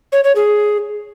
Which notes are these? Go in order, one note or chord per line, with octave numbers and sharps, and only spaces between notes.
C#5
C#5
G#4